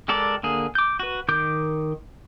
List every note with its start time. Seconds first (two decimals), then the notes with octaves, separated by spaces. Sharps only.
0.08 G#3 G4 A4 A#4 D5
0.43 D3 A#3 G#4
0.75 D6 G6
1.00 F#4 B4
1.28 D#3 A#4 D6 G6